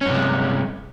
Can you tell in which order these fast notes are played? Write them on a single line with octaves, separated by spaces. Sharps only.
C#4 G2 C3 G#3